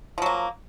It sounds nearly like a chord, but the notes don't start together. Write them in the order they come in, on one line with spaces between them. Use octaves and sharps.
F3 F#3 A#3